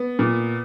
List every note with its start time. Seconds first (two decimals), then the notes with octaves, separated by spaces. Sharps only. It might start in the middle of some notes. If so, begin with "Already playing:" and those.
Already playing: B3
0.19 A#2